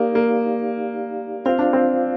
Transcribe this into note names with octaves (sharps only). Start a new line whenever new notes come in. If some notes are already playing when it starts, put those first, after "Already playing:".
Already playing: A#3 D#4 G4 D5 F5
A#3
C4 F4 C5 F5
D4
C4